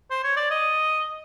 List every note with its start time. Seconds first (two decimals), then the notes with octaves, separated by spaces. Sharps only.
0.11 C5
0.24 C#5
0.37 D5
0.51 D#5